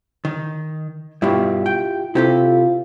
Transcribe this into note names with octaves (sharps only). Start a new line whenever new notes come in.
D#3
G2 B2 E4 F4 G4
G5
C3 C4 E4 F4 G4 A4